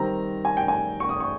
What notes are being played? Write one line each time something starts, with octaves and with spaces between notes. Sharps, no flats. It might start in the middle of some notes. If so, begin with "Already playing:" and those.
Already playing: D#3 G3 C4 A#5
G#5
G5
G#5
C#6
D#6
C#6